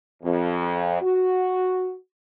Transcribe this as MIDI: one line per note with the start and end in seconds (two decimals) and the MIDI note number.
0.23 1.01 41
1.02 1.92 66